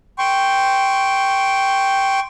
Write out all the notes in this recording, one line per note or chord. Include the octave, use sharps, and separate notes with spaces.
G5 C6 C#6